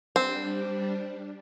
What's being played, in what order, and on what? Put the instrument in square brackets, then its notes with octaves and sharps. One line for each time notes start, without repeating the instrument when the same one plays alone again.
[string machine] G3 D4 [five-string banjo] C4